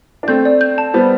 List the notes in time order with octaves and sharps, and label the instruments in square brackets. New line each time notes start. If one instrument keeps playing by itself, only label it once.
[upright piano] D4
[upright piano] A3 C4 [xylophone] G6
[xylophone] D5
G6
A5
[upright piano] G3 B3 [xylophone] C5